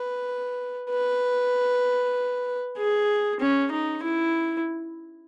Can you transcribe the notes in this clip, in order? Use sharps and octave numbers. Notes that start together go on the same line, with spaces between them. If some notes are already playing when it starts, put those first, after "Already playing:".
Already playing: B4
B4
G#4
C#4
D#4
E4